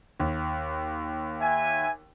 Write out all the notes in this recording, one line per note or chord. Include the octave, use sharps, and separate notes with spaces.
D#2
E5 G#5